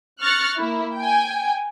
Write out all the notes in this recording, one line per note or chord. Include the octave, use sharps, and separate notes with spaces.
C#6 F6 F#6 A6 A#6 C#7
A#3 E4
G5 G#5